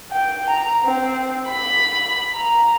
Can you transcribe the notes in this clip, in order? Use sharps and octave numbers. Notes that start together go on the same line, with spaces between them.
G5
A#5
C4
B5
A#5